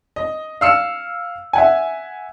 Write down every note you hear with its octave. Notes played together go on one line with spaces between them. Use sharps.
D#5
F5 E6 C#7 E7
E5 F#5 G#5